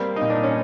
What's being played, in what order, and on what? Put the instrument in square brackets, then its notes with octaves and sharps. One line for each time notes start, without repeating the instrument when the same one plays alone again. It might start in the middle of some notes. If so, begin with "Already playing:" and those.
Already playing: [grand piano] G3 [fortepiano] A#3 C4
[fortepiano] D#4
[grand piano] A#2
[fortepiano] D4
C#4